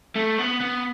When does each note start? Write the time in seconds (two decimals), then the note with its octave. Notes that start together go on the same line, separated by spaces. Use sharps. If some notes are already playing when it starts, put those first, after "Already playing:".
0.15 A3
0.38 B3
0.60 B3